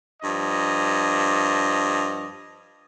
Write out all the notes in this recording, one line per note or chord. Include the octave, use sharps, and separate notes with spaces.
G2 F3 D#5